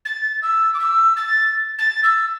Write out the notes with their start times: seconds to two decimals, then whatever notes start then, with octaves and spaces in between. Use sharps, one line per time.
0.05 A6
0.42 E6
0.73 D6
0.79 E6
1.16 A6
1.78 A6
2.03 E6